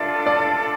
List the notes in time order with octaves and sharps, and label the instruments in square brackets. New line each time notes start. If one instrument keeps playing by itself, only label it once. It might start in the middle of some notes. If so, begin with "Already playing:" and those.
Already playing: [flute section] D4 F4 A4 [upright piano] D5 E5
[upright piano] D5